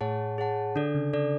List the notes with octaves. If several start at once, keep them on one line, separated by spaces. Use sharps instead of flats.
A2 G#4 C#5 F#5 A5
G#4 C#5 F#5 A5
D3 D4 A4 D5
C#3
C#3 D4 A4 D5